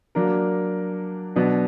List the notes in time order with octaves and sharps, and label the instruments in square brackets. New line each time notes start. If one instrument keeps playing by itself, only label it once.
[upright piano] F#3 A#3 D4 A#4
B2 F#3 B3 D4